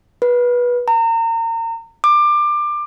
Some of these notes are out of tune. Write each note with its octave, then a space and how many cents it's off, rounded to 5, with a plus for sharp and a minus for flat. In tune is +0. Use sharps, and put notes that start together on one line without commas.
B4 -20
A#5 -35
D6 +20